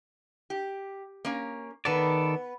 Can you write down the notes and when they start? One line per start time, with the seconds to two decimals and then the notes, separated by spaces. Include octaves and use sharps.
0.50 G4
1.25 A#3 C#4
1.85 D#3 B3 A4 B4 D5